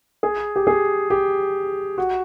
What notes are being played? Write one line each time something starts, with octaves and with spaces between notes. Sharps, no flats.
G#4
G4
G#4
G4
F#4